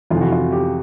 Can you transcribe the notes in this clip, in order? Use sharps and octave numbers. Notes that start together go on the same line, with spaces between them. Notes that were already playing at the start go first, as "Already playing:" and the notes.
F2 C3 E3 F4
F#4
F4
G4